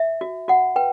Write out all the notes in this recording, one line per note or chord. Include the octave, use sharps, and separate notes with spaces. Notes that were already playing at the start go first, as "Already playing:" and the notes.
Already playing: E5
F#4
F#4 F#5
B4 G5